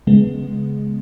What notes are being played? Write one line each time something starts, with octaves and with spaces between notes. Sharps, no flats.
C#3 G#3 B3